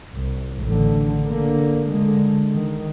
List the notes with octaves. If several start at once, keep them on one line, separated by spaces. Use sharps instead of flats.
C2
A1 D3
D3 A#3
D3 G#3
D#3